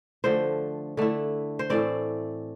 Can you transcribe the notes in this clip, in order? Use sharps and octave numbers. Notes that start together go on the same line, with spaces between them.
D3 F3 A3 C5
D3 A3 E4
C5
A2 E3 A3 C4 D5